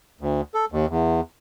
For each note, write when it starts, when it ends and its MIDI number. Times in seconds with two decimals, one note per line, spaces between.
0.21 0.41 38
0.54 0.65 69
0.72 0.86 39
0.90 1.21 40